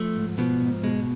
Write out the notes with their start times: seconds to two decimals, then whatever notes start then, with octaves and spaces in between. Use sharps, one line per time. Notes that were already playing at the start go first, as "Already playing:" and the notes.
Already playing: F3 A3
0.16 G#2
0.38 B2 F3 B3
0.61 G#2
0.83 B2 G#3